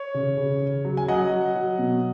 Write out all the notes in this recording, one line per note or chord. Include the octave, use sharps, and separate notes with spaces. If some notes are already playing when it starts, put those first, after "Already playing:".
Already playing: C#5
C#3
C#3
C#3
F#3
G#5
F#3 D#5 F#5
F#3
F#3
B2